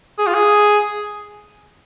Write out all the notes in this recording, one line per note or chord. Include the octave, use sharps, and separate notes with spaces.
G#4
F4
G#4